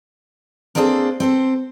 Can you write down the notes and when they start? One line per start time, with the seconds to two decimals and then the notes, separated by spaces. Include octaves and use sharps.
0.75 A#3 C4 D4 G#4 A4 C5
1.20 C4 A4 C5